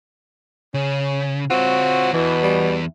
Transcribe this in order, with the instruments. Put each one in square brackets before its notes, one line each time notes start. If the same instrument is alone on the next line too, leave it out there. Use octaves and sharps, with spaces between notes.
[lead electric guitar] C#3 [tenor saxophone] C#4
[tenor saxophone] C4 [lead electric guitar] F4 C#5 [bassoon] F#4
[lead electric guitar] E2 [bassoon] B2 [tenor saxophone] E3
[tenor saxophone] G3